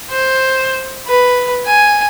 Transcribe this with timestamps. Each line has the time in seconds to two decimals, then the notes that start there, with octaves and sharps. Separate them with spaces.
0.11 C5
1.07 B4
1.66 G#5